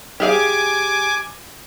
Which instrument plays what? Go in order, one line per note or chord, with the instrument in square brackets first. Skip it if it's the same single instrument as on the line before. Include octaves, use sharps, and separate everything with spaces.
[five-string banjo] G4 G#4 F5 [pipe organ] G#5 D6